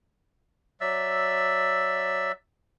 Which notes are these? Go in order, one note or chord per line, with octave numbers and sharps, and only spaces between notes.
F#3 D5 E5 E6